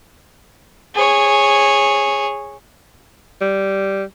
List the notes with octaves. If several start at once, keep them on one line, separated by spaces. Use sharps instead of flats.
G#4 C#5
G3